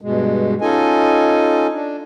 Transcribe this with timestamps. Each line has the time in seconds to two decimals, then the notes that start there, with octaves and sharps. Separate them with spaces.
0.01 G2 B2 G#3
0.61 C#4 D#4 F4 A4 D#5 G#5
1.73 D4